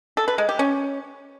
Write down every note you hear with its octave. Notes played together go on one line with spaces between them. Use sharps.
A4
B4
G#3
G4
C#4